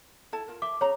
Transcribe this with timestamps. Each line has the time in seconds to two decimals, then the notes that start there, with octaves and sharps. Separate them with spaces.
0.32 E4 A4 A5
0.48 F4 A#4
0.62 E5 D6
0.81 C#4 G#4 C#5 A#5